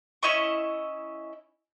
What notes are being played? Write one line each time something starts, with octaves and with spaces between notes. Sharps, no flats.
C#4 E4 D#5 C#6